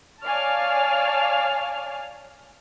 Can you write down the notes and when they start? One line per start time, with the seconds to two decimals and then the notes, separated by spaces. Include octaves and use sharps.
0.25 C#5 D5 F5 G#5 A5 F6